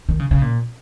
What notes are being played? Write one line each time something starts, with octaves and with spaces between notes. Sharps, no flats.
D#3
C#3
C#3
A#2